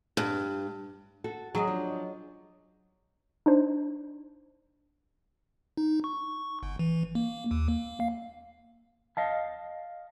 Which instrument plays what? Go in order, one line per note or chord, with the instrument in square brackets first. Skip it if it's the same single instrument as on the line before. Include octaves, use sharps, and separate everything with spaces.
[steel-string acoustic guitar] G2
[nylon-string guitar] F#4 A4
[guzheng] F#3 D#5 [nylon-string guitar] G#4
[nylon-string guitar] F3 D4
[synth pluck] D4 D#4 C5
[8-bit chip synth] D#4
C#6
G1
E3
A#3
D#2
A#3
F5
[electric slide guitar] D#5 F5 A5